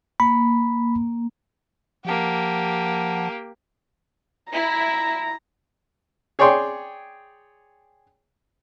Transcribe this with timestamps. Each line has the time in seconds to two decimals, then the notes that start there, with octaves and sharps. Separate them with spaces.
0.20 A#3 B5
2.05 F3 A#3 G4 F#5 A5
4.53 E4 A#5
6.39 G#4 C#5 D5 G5 C6